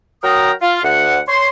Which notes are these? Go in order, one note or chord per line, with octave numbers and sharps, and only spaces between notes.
F#3 A#4 G5 A#5 D#6
F4
D2 F#5
C#5 C6